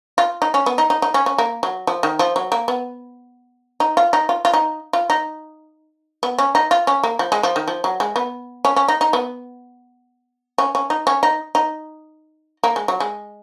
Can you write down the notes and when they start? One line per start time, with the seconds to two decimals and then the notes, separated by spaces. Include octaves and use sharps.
0.18 F4
0.42 D#4
0.54 C#4
0.66 B3
0.78 D#4
0.90 D#4
1.02 D#4
1.14 C#4
1.26 C#4
1.38 A#3
1.63 F#3
1.87 F3
2.03 D#3
2.19 F3
2.36 F#3
2.52 A#3
2.68 B3
3.80 D#4
3.97 F4
4.13 D#4
4.29 F4
4.45 F4
4.53 D#4
4.93 F4
5.10 D#4
6.23 B3
6.38 C#4
6.55 D#4
6.71 F4
6.87 C#4
7.03 A#3
7.19 F3
7.32 G#3
7.43 F3
7.56 D#3
7.68 F3
7.84 F#3
8.00 G#3
8.16 B3
8.65 C#4
8.76 C#4
8.88 D#4
9.01 D#4
9.13 B3
10.58 C#4
10.75 C#4
10.90 D#4
11.07 C#4
11.23 D#4
11.55 D#4
12.64 A#3
12.76 G#3
12.88 F#3
13.00 G#3